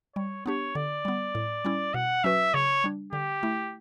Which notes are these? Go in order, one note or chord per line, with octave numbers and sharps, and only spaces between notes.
G3 C#5
B3 D4 G4 C#5
D3 D5
G3 B3
A2
G3 C#4 E4
B2 F#5
F#3 C#4 F#4 B4 E5
C#3 C#5
G3 D4
D3 G4
A3 E4